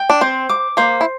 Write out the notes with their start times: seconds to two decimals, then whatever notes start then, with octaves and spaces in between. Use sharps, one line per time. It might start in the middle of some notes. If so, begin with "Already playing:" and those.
Already playing: G5
0.10 D4
0.21 C4 C5
0.49 D6
0.77 A#3 C5
1.01 E4